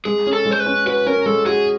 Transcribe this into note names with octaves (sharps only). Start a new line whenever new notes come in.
G#3 G#4
C#4
A4
G#3
C5
B4
C#4
F#4 B4
C#4 A#4
G#3 A4
F#4 G#4